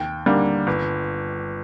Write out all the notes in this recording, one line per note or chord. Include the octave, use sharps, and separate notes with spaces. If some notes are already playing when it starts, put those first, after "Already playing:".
Already playing: D#2 G5
D3 G3 A#3
G1